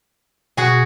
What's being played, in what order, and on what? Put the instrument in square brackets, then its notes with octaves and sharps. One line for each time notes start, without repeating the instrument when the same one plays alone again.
[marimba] B2 [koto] F#4 G#4